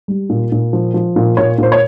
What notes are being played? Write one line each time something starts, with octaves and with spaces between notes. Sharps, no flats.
G3
A#2
A#2
F3
F3
A#2
A#2 C#5
A#2 C5
C#5